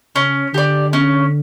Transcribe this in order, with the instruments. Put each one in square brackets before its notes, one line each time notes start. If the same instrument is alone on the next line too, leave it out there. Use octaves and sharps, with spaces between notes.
[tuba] C#3 [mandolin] C#4
[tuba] D3 [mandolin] G4 D5
[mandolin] C#4